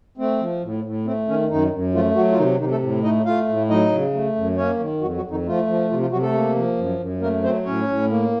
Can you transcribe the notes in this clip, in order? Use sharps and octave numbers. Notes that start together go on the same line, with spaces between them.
A3 C4
F3
A2
A2
A3 C4
D#3 C#4
F#2 D#3 D#4
F#2
F3 A3 F4
F#3 F#4
F4
C3 D#3 D#4
C3 D#3 D#4
A3 A4
A2
A3 D#4 D#5
A3 F4 F5
A2
F#3 D#4 D#5
C#3
A3
F#2
A#3 C#4 C#5
D#3
F2 F#3 F#4
F#3 F#4
F2
D#3 D#4
F3 A3 F4
F3
C3 F3 F4
F3 F4
C3 F#3 F#4
A3 A4
A#3
F3
F#2
F#2
A3 A#3 A#4
F#3 C4 C5
A2 C#4 C#5
A2
A#3